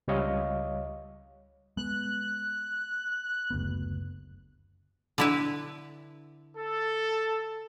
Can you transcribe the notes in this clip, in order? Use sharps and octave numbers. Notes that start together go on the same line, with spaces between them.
C#2 G3 C#5 D#5 F5
G#3 B3 F#6
F#1 D2 B3
D3 E4 B4
A4